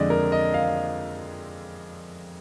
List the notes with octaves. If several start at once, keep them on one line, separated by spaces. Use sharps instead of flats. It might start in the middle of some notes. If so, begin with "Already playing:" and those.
Already playing: F2 D3 G#3 C4 D5 D#5
A#4
D#5
F5